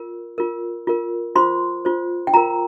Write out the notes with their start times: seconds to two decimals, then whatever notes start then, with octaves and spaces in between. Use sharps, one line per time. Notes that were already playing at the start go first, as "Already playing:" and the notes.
Already playing: F4 A#4
0.38 F4 A#4
0.87 F4 A#4
1.36 F4 C5 C6
1.85 F4 C5
2.27 G5
2.34 F4 A#4 A#5